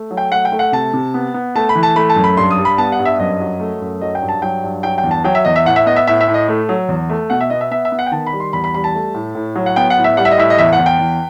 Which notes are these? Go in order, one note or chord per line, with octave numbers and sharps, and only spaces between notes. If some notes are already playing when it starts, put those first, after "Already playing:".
Already playing: A3
F#3
G5
A3 F#5
G5
A3
F#5
C3 A5
C3
B3
B3
A3 A5
B5
E3
A5
A3 B5
A5
F#2
B5
G2 C6
D#6
G3
B5
B3 A5
F#5
G2
E5
F#2 D#5
F#3
A3
F#2
F#3 D#5
G5
G2
A5
F#3 G5
G2
F#3 G5
G5
E2
A5
F#3 G5
E5
E2 D#5
E5
A2 F#5
E5
B3 D#5
E5
A2 E5
E5
A2
D#5
A3
F#3
E2
A3
B2 F#5
E5
B3 D#5
E5
B3 E5
E5
B3
F#5
G5
D#3 A5
B5
G3
C6
E2 B5
B5
G3 B5
A5
A3
A2
A2
F#3
F#5
B3 G5
F#5
A2
E5
G3 F#5
E5
D#5
A2 E5
D#5
E2 E5
F#5
E2
G5
E2